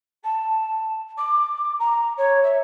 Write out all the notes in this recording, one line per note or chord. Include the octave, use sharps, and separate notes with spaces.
A5
D6
A#5
C#5
E5